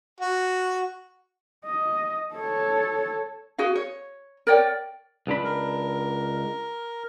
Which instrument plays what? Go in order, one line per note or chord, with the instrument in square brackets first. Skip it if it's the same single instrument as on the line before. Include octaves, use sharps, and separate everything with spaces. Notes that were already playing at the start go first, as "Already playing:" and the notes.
[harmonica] F#4
[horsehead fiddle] D#5
A4 C#5
[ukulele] F#4 G#4 F5
C#5
A#4 C#5 D5 G5
[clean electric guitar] C#2 D4 B5
[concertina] A#4